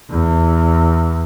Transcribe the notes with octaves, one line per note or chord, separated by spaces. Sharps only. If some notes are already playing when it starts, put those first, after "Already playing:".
E2